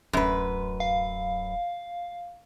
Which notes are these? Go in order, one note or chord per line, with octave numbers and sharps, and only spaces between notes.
D1 F#2 C#4 B4
F5